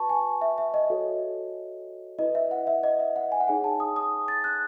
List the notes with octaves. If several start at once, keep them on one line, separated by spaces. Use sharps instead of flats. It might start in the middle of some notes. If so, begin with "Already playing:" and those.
Already playing: F#4 B4 A5 C#6
G#5
E5
E5
D#5
F#4 A4 C#5
E4 B4 D#5
E5
F#5
E5
D#5
E5
F#5
G#5
F#5
D#4 G#4 C#5 G#5
A5
D#6
D#6
A6
F#6